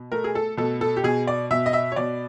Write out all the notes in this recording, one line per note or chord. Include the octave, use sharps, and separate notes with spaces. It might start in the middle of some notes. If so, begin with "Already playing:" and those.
Already playing: B2
A3 A#4
G#4
A4
B2 A4
A4
G4
B2 G#4
D5
B2 E5
D#5
E5
C#5
B2 D5